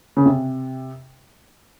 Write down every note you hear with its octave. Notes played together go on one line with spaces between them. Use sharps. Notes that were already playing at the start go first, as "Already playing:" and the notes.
C#3
C3